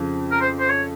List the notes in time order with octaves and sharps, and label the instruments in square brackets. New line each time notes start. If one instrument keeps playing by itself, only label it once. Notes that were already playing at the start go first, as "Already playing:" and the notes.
Already playing: [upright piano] F2 C#3 F3
[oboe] A#4
C5
C5
C#5